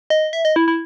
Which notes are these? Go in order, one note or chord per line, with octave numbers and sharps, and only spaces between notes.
D#5
E5
D#5
E4
E4